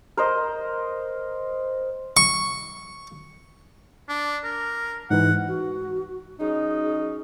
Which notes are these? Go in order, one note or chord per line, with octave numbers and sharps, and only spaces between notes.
A#4 C5 D#5
C#6
D4
A#4
G#2 E3 F#5
F#4
F#3 C#4 D#4 G#4